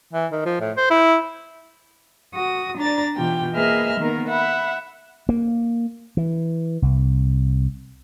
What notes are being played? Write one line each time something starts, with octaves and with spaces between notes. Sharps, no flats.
E3
D#3
F3
A2
C5
E4
F#4 D#6
D4 D5 A#5 A6
B2 E3 F4 G4 G5
A#3 G#4 B4 D#5 E5 F6
D#3 A#3 B3 A#4
E5 F#5 B5
A#3
E3
C2